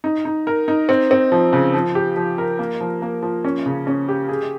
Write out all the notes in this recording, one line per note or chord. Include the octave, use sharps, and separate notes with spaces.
D#4
D#4
A#4
D#4
C4
C4
F3
C#3
F3
G4
F3
A#4
A#3
F3
A#3
F3
C#4
C#3
C#4
G4
G#4